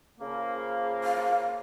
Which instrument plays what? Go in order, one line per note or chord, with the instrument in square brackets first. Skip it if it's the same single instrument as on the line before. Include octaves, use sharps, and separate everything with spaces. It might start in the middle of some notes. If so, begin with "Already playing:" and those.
[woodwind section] C#3 F3 A#3
[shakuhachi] F5